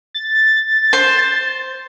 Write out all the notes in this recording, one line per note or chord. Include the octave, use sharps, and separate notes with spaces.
A6
C5